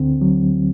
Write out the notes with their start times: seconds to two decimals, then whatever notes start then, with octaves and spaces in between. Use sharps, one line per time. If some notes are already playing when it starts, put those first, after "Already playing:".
Already playing: D2 D3 C4
0.21 F#3